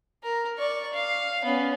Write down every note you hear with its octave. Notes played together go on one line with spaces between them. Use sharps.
A#4
D5 C#6
F5
B3 C#4